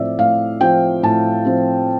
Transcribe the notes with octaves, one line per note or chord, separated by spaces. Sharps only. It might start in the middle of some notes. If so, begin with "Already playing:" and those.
Already playing: A2 F3 C4 D5 E5
A2 F5
F3 C4 G5
A2 A5
F3 C4